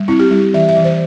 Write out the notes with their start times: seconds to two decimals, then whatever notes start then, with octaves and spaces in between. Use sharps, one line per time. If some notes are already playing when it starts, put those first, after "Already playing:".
Already playing: G3
0.08 C4 E4
0.19 G4
0.31 G3 E4
0.54 E3 E5
0.69 E5
0.77 E3
0.84 C5